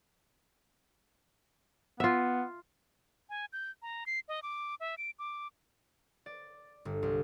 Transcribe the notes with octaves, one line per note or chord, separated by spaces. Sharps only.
B3 F4 E5
G#5
G6
A#5
C7
D#5
D6
E5
D7
D6
D5
G1
C2